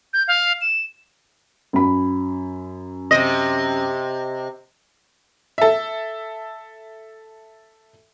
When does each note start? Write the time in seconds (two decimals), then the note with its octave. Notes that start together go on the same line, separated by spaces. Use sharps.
0.13 G6
0.28 F5
0.61 E7
1.73 F#2 B5
3.11 C3 D#5
5.58 A4 E5